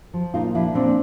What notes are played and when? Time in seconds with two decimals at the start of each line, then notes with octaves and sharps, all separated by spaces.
0.14 F3
0.34 A#2 D#4 F4
0.54 F3 D4 E4
0.75 A#2 C4 D4